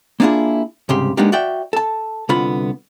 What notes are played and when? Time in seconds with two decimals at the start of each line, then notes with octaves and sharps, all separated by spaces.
0.20 A#3 B3 D4 E4 F4 G#4
0.89 C2 G#2 C#3 G4 C6
1.17 G#3 A#3 B3 D4 D#4 G4
1.32 F#4 D5 E5 G5
1.73 A4 A5
2.29 C2 D3 B3 F4 B5